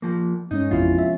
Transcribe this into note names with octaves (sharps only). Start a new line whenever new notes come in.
F3 A#3
G2 G#3 C#4 D#4 C#5
A1 F2 C3 F3 B3 E4 F4
E5